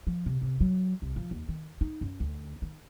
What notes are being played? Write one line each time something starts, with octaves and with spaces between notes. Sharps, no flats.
F3
C3
C3
F#3
C2
F3
D#2
D#3
D#4
F#2
D2
D#3